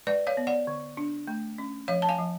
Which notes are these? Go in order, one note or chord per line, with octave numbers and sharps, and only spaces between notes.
G#3 B4 D5
C#5 F5
B3
D5 F#5
D3
D4
A3
C#4
F3 C#5 F5
A5
F5 G#5
F3